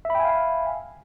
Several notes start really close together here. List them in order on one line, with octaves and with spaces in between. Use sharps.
E5 B5 G5 G#5 F5